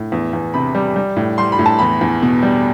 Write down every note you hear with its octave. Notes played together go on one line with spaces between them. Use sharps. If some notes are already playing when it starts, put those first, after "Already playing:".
Already playing: A2
E2
E2
C3 B5
G3
G3
A2
G3 C6
B5
A2
A5
E2 B5
E2
B2
G3